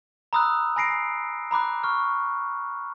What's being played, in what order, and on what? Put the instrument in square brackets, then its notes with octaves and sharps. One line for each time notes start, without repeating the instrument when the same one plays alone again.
[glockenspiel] A#5 B5 D#6 E6 F#6
G#5 B5 A#6 C7 D7
A#5 B5 D6 F#6
C#6 F6